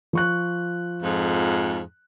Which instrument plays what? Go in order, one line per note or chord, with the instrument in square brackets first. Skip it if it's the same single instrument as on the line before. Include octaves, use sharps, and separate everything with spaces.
[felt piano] F3 C#6 F#6
[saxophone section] F2 G#2